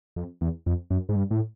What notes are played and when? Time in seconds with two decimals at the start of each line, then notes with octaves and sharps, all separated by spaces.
0.16 F2
0.41 E2
0.66 F2
0.90 F#2
1.09 G#2
1.16 G2
1.31 A2